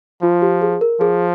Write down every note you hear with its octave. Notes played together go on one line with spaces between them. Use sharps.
F3 F4
G4
G#4
A#4
F3 G#4